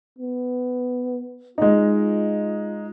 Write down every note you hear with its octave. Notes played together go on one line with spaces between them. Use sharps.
B3
G#3 D#4 F4